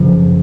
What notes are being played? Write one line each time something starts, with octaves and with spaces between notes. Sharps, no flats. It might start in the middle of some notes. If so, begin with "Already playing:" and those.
Already playing: F#2 C#3 F3